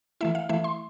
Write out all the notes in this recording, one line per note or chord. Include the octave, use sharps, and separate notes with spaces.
E3 A3 E4 E5
F5
E3 A3 E4 E5
C6